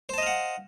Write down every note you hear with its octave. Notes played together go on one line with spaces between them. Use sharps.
C5 D#5 F5 F#5 A5